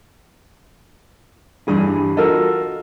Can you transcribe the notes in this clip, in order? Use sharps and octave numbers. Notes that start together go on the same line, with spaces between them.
G2 E3 G3 G#4
F4 F#4 A4 A#4 D#5